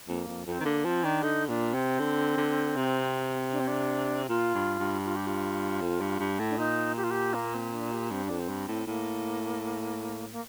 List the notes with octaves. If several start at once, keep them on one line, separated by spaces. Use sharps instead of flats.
F2 A#3
F2
F2 C4
D#3
D3 A#3
F3 C4
D#3 D4
D3 D#4
A#2 D4
C3 C4
D3
D3
C3
D4
C4
D4
A#2 F4
G2
G2
F4
G4
F4
F2
G2
G2
A2
D4
A#2 D#4
G4
F4
G4
A#3
C4
D4
G4
G2 C4
F2 D4
C4
G2
A2
A2 A#3
A#3